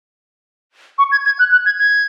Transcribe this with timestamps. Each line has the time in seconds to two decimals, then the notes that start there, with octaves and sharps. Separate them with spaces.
0.98 C#6
1.12 G#6
1.26 G#6
1.39 F#6
1.52 F#6
1.66 G#6
1.79 G#6